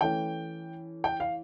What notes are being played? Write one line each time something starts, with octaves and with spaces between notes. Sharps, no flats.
E3 A3 C#4 G5
G5
F5